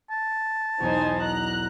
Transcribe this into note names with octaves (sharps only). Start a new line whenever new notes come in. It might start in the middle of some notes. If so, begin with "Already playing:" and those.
A5
B1 E2 D#4 C5 G#5
A#5 F#6